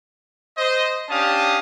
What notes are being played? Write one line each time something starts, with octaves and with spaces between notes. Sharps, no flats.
C5 D#5
C#4 D4 G4 F5 A5 D#6